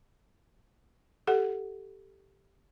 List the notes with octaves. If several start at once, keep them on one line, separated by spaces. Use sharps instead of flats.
G4 A4 F#5